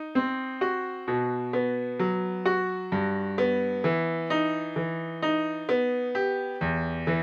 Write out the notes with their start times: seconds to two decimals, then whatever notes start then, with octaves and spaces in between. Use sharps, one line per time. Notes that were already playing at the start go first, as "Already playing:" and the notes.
Already playing: D#4
0.15 C4
0.61 F#4
1.08 B2
1.53 B3
1.99 F#3
2.45 F#4
2.92 G2
3.38 B3
3.84 E3
4.30 D#4
4.76 E3
5.22 D#4
5.69 B3
6.15 G4
6.61 E2
7.07 E3